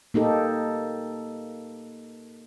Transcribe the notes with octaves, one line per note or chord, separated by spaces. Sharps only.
A#3 D#4 G4 A4